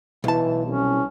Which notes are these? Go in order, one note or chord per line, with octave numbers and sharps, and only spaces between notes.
B1 E3 A5
C2 C#4